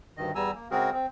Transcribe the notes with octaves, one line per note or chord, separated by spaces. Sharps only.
D2 G2 D#3 D#5
E2 G3 B3 G#5 A#5 E6
A#3
C#3 G#3 C4 F#4 G#4 A#4
C4